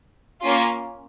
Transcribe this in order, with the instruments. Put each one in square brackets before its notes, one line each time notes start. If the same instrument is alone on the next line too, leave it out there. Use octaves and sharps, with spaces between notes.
[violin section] A#3 C#4 F4